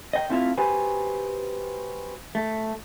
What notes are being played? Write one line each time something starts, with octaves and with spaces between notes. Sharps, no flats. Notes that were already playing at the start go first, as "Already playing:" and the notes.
D#5 G5
A3 C4 E4 F4 E5 F5
F#4 G4 B4 C5 G#5
A3